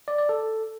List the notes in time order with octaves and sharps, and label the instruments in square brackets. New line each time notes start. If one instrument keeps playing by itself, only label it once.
[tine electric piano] D5
D5
A4